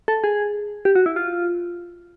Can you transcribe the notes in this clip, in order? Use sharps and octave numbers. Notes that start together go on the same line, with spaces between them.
A4
G#4
G4
F#4
E4
F4